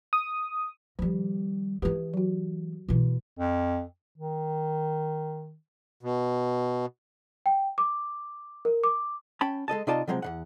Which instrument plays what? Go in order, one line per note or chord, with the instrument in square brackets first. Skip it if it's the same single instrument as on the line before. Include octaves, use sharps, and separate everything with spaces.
[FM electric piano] D#6
[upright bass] D#3 G3 [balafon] F3
[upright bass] E3 G#3 [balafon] G4 B4
[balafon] F#3 F#4
[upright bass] B2 E3
[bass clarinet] F2
D#3
[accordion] B2
[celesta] G5
D6
A#4
D6
[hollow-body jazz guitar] C#4 G5 A5 B5
G#3 A4 D#5 A5
C3 D#4 F4 D5 D#5 A5
C3 F3 F#3 G#3 A3 C4
E2 C#3 F#5